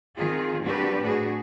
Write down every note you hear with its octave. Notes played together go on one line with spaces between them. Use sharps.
D#3 C4 F4 G#4
G3 C4 D4 F#4 G4 B4
A2 D4 F#4 G#4